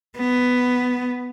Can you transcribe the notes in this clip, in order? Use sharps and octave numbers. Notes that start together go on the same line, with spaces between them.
B3